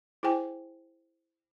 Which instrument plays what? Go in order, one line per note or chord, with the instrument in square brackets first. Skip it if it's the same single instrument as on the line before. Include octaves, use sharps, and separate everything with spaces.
[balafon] E4 G#4 C5 G5 G#5